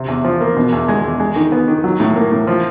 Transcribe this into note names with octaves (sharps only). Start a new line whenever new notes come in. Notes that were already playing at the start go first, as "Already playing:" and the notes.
Already playing: C3
E2
F3
A#3
B2
E2
G#3
E2
G#3
D#3
B3
D#3
F#3
A2
A#3
A2
F3